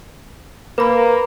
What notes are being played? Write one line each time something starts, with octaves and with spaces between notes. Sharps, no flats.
A#3 B4 B5